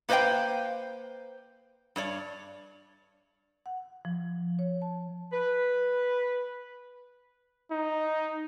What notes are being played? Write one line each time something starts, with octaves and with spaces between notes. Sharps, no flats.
A#3 B4 C5 D#5 F5 G5
G2 C#5 D5
F#5
F3
C#5
A5
B4
D#4